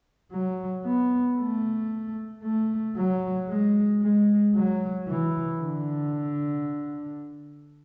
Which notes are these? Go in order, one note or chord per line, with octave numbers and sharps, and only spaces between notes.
F#3
B3
A3
A3
F#3
G#3
G#3
F#3
E3
D3